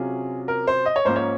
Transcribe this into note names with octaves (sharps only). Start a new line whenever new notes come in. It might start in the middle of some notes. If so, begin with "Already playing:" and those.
Already playing: C3 F#3 C#4 F4 G#4
A#4
C5
D#5
C#5
G#2 F3 A#3 C#4 C5
C#5